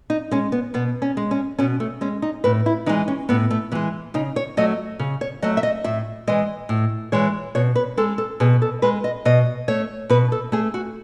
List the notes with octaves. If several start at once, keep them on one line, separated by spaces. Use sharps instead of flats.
D#4
G#3 C#4
B3
B2 B3
C#4
G#3
C#4
B2 C#4
A3
G#3 C#4
D#4
A2 B4
E4
E3 G#3 D#4
C#4
A2 B3
A3
E3 G#3 B3
C#3 D#4
C#5
F#3 A3 D#5
C#3
C#5
F#3 A3 D#5
E5
D#5
A2 E5
E3 G#3 D#5
A2
E3 G#3 C#5
B2 C#5
B4
G#3 A4
A4
B2 G#4
A4
G#3 B4
D#5
B2 D#5
A3 C#5
B2 B4
A4
A3 G#4
F#4